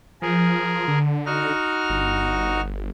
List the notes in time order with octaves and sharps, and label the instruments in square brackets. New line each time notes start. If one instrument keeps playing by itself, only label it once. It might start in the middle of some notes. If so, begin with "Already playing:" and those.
[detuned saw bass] F3 [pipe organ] G#4 A#4
[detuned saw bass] D3
[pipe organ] D#4 F#4 F6
[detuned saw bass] G1